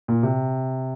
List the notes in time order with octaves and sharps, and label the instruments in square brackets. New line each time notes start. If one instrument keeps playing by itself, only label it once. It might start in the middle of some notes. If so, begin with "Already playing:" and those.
[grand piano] A#2
C3